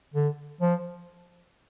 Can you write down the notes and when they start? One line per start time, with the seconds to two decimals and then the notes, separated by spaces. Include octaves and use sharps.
0.14 D3
0.61 F3